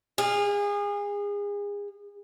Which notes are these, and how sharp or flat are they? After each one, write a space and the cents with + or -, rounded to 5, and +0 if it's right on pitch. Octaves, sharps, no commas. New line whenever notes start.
G#4 -30 F5 +0